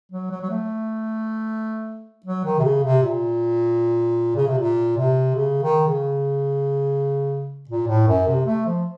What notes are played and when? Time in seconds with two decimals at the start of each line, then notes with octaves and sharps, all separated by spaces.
0.12 F#3
0.31 F#3
0.42 F#3
0.50 A3
2.26 F#3
2.44 D#3
2.59 C3
2.64 C#3
2.83 C3
3.03 A#2
4.36 C#3
4.47 C3
4.58 A#2
4.97 C3
5.35 C#3
5.62 D#3
5.87 C#3
7.69 A#2
7.88 A2
8.08 F#2
8.27 C3
8.46 A3
8.66 F3